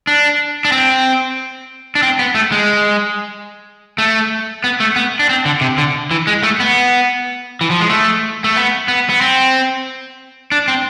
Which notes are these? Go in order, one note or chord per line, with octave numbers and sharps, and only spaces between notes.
D4
D4
C4
D4
C4
B3
A3
G#3
A3
B3
A3
B3
D4
C4
D3
C3
D3
E3
G#3
A3
B3
E3
F3
G#3
A3
A3
B3
B3
B3
C4
D4
C4